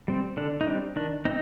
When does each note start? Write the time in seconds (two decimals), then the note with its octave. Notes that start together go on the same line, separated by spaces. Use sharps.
0.08 G3 C4
0.37 D3 D4
0.61 D#4
0.67 G3 C4 D4
0.96 D#3 D4
1.25 C4 D#4